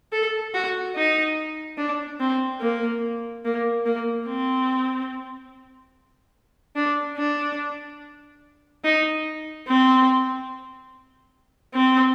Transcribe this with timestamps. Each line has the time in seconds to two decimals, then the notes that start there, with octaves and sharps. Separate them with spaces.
0.12 A4
0.54 F#4
0.95 D#4
1.78 D4
2.20 C4
2.61 A#3
3.45 A#3
3.86 A#3
4.28 C4
6.76 D4
7.17 D4
8.84 D#4
9.67 C4
11.74 C4